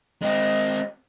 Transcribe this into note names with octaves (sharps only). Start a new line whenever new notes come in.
G#3 C4 D#5